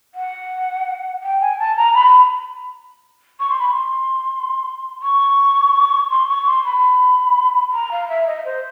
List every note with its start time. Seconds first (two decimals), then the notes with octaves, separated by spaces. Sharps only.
0.15 F#5
1.23 G5
1.41 G#5
1.59 A5
1.77 A#5
1.95 B5
3.40 C#6
3.50 C6
3.60 B5
3.70 C6
5.03 C#6
6.10 C6
6.28 C#6
6.47 C6
6.65 B5
7.73 A#5
7.91 F5
8.09 E5
8.27 D#5
8.45 C5